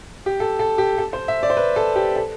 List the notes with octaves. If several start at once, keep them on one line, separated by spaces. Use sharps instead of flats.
G4
A4
A4
G4
A4
C5
E5
D5
C5
B4
A4
G4
A4